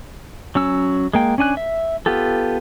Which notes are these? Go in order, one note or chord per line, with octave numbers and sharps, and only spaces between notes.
F#3 C#4 E6
G#3 A#3 G5
C#4 D4 G#5 F#6
E5
B3 F4 G4 A4